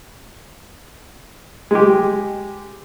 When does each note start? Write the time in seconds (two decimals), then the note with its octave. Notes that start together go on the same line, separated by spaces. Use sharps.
1.71 G#3 G4